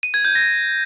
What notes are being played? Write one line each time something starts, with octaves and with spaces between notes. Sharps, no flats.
D#7
G#6
G6
A#6